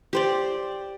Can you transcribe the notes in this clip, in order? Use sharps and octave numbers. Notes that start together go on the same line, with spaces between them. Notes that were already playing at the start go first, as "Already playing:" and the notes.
G4 C5 D5